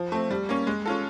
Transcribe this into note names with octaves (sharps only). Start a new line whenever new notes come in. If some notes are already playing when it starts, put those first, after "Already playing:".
Already playing: F3
A3 C4
G3
A#3 C#4
G#3
C#4 F4 A4